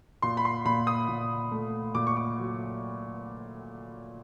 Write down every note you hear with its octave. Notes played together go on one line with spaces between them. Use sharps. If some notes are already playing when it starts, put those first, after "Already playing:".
A#2 C6
B5
C6
A#2 B5
D#6
A#2
A3
A#2 D6
C#6
D6
F#3